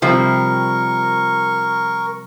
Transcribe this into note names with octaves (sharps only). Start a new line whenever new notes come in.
C3 F3 G3 A#4 C#6